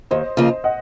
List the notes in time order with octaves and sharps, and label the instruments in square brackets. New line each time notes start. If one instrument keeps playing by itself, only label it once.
[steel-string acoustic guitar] D#2 [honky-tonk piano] C5 D#5
[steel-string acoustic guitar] C#3 F3 A#3 F4
[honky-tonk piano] D#5 F#5